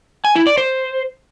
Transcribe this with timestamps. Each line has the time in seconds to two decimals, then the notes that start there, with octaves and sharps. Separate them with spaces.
0.25 G#5
0.36 E4
0.47 D5
0.58 C5